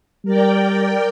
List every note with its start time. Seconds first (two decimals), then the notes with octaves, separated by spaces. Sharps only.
0.25 G3 A#4 D5 G5